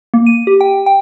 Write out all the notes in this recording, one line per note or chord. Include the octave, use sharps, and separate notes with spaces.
A#3
D#7
G4
G5
G5